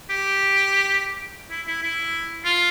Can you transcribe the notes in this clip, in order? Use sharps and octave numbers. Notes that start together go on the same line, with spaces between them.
G4
E4
E4
E4
F4